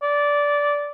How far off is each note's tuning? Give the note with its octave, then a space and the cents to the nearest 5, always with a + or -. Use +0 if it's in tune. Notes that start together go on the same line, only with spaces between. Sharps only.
D5 -15